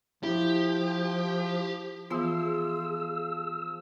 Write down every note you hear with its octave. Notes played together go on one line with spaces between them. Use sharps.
F3 E4 G4
E3 F3 B3 G#4 C6 E6